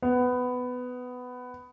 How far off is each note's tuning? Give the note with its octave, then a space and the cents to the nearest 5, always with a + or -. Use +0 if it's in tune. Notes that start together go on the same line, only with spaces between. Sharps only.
B3 +15